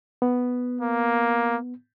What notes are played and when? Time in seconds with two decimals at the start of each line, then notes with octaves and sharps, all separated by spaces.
0.22 B3
0.81 A#3